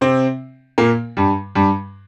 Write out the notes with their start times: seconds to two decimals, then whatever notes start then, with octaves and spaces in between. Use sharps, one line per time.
0.01 C3 C4
0.78 A#2 A#3
1.17 G2 G3
1.55 G2 G3